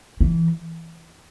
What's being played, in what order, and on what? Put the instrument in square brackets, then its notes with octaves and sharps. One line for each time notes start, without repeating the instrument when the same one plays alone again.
[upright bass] E3